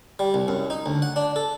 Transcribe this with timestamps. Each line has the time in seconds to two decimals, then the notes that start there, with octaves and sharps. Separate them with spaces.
0.19 G3
0.34 C2
0.48 F#2
0.70 D#4
0.86 D2
1.02 F#5
1.16 D4
1.36 A4